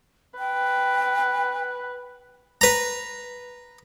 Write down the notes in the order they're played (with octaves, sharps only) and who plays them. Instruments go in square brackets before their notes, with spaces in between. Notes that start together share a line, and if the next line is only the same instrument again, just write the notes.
[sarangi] B4 [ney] G5
[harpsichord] B4 A#5